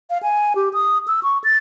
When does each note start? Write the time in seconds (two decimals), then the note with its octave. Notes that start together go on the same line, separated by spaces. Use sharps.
0.10 F5
0.23 G#5
0.55 G4
0.74 D#6
1.08 E6
1.23 C#6
1.44 A6